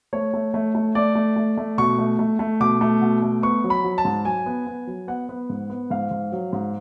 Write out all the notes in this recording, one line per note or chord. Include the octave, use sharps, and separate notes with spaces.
A3 C#5
A3
A3
A3
A3 D5
A3
A3
A3
B2 C#6
A3
A3
A3
B2 D6
A3
B2
A3
B3 C#6
F#3
B5
F#3
A5
G#2
F#3 G#5
B3
B3
F#3
B3 F#5
B3
G#2
B3
G#2 F5
G#2
F#3
G#2